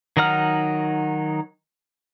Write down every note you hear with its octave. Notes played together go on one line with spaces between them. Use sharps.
D#3 F#3 D#4 F#5 F6